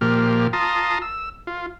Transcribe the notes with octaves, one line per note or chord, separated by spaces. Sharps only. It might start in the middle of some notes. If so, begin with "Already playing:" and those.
A#2 F3 A#3 G4 F6
F4 A5 A#5 C6 D#6
E6
F4